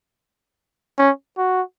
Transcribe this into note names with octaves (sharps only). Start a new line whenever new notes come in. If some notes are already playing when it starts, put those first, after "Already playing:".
C#4
F#4